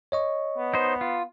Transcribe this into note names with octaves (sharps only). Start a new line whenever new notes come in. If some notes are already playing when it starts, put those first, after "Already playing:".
C#5 D#5 C#6
B3
D#4 C5
F4